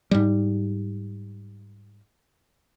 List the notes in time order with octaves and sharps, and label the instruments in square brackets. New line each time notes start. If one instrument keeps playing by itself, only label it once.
[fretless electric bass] G#2 G3